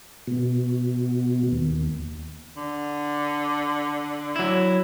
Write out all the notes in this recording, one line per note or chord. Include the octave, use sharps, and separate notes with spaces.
B2
D#2
D3
F#3 E4